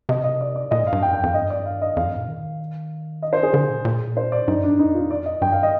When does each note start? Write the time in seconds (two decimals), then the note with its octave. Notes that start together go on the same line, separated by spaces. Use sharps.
0.09 C3 D#5
0.24 D#5
0.41 D5
0.56 D5
0.71 A#2 D#5
0.81 G#2
0.87 F5
0.92 G2
1.02 F2 G5
1.13 G2 G5
1.23 F2 F5
1.34 G2 D#5
1.50 D5
1.66 F5
1.82 D#5
1.96 F2 F5
2.07 G2
2.18 A#2
2.28 D#3
3.22 D#5
3.33 C5
3.43 G#4
3.53 D3 G#4
3.69 A#2
3.85 A#2
4.17 C5
4.32 D5
4.48 G2 D#4
4.63 D4
4.79 F2 D#4
4.95 F4
5.11 D5
5.26 D#5
5.42 G2 G5
5.52 F5
5.63 D#5